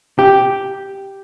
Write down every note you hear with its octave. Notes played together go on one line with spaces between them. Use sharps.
G4